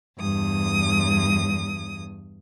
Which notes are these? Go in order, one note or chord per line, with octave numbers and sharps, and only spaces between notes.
E2 G2 D#6